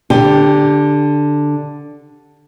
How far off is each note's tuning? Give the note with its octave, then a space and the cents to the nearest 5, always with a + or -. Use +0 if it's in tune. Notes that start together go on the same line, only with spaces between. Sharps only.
D3 +0 G4 +15 G5 +0